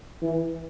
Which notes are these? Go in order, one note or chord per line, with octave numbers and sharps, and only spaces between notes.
E3